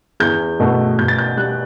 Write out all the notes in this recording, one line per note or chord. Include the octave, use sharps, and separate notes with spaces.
E2 G6
B2 A3
B2 G6
A6
G6
G3 F#6